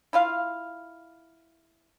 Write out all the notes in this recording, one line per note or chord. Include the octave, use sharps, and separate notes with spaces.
E4 F4 F5